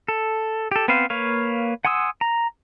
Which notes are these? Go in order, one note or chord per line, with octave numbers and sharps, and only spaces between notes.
A4
G4 A4
B3 C4 B4 C5 F5
A#3 B4 C#5 F5
F#5 G#5 C6 D#6 E6
A#5